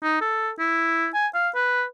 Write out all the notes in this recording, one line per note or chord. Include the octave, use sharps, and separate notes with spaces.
D#4
A4
E4
G#5
F5
B4